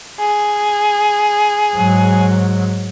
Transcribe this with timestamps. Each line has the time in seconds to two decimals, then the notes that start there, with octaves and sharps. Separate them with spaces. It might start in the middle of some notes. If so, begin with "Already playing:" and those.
0.20 G#4
1.76 G#2 F#3